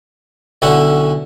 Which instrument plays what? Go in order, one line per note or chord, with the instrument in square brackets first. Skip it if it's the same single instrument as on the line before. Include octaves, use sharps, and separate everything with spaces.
[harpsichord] B1 D3 C#4 E4 F#5